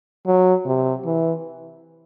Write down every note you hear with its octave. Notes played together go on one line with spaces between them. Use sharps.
F#3
C3
E3